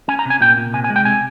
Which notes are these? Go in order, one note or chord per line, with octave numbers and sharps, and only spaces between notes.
C#4 G#5
A#5
C3 G#5
A#2 G5
A#2
C3 G#5
G#5
G#3
G5
C3 G#5